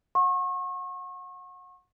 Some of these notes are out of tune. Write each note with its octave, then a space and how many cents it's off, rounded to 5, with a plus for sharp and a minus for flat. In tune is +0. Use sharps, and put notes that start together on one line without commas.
F#5 -25 C#6 -35